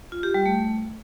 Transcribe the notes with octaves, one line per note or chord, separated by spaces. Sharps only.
F4
G4
G3
A3